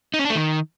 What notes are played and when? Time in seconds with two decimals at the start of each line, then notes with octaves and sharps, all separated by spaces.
0.14 D#4
0.19 C#4
0.25 D4
0.30 A3
0.35 D#3